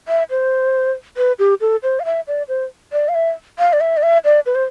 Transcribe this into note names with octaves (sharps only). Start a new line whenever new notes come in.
E5
C5
B4
G4
A4
C5
F5
E5
D5
C5
D5
F5
E5
F5
D5
E5
D5
E5
D5
B4
C5